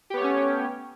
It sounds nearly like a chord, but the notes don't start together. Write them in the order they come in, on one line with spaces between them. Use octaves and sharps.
G4 B3 C#5 A3 C#4